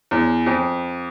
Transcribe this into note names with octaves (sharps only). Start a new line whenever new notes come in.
E2
F2